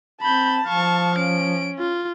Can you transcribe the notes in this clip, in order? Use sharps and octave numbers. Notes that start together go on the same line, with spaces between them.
C4 A5 B5 G6
F3 F5 C#6
C#4 D7
F4